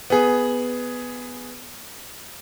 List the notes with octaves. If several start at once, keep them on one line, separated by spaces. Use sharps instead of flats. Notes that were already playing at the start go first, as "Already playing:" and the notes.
B3 G#4